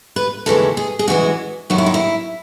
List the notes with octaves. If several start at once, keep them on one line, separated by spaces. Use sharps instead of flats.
B4
D#2 C#3 E3 G#3 A4
G#4
G#4
F#2 E3 G#3 F#4
F#2 D#3 F#3 F#4
E4
D#4
E4